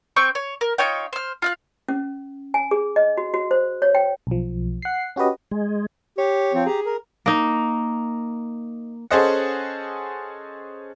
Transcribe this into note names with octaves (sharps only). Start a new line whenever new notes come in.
C4 G5 C#6 G6
C#5
A#4
D#4 F4 C#5 G5
C5 F6
F4 F5 F#6
C#4
G#5
G#4
D#5
F#4
F#4
C5
C#5
G5
B1 F3
F#5 C7
C#4 F#4 G4 B4 D#5
G#3
G4 C#5
F3 C4
G4 G#4 A#5
A#4
A#3 D#4
C#4 G#4 A4 C5 D#5 F#5